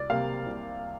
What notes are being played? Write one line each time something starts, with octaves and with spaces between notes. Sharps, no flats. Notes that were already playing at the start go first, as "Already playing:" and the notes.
Already playing: C2 D5
C3 G3 A#3 F5
C2